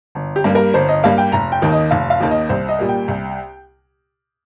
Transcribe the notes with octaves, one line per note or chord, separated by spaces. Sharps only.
G1
G4
G2 G3 A#3
A#4
G1 C5
D#5
G2 G3 A#3 F5
G5
F1 A#5
G5
D#2 D#3 A#3
D#5
F1 F5
F5
D#2 D#3 A#3
D#5
C2 C5
D#5
A#2 G3 A#3
G5
C2